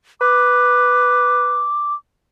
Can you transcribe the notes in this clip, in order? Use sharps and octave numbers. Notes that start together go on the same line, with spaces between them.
B4 D6